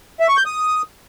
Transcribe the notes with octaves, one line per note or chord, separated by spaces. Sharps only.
E5
C#6
G6
D#6